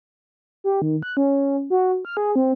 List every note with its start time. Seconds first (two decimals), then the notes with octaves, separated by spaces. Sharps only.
0.64 G4
0.82 D#3
1.03 F#6
1.17 C#4
1.70 F#4
2.05 F6
2.17 G#4
2.36 C4